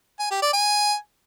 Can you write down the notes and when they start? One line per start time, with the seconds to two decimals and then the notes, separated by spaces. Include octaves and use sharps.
0.20 G#5
0.31 G4
0.42 D5
0.53 G#5